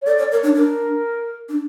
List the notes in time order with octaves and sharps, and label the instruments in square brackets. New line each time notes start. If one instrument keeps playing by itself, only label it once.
[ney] C#5
[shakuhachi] A4 [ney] D5
[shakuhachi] C#5
[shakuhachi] A#4 [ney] C#5
[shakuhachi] D4
[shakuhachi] D4 [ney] A#4
[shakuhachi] D4